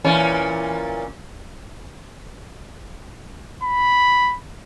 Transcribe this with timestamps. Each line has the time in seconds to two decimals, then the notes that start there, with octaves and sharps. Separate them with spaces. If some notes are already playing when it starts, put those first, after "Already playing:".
0.04 A#2 E3 C#4
3.63 B5